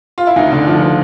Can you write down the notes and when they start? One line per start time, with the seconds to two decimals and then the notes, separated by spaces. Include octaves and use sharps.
0.18 F4
0.27 E4
0.36 D2 D#4
0.52 D3
0.67 F3
0.82 F3